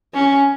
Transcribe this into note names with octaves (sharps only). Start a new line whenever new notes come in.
C#4